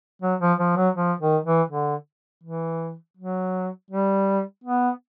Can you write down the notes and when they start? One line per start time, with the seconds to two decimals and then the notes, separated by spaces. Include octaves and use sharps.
0.22 F#3
0.40 F3
0.59 F3
0.76 F#3
0.96 F3
1.20 D#3
1.45 E3
1.69 D3
2.43 E3
3.17 F#3
3.90 G3
4.64 B3